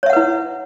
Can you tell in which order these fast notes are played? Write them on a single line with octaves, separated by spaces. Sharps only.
C#5 E5 F#5 B4 E4